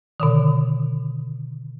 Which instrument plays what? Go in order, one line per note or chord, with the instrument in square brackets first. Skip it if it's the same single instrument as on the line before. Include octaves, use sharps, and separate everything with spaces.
[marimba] B2 D3 D#3